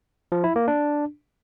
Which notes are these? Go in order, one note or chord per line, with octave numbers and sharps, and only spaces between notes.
F3
E4
A#3
D4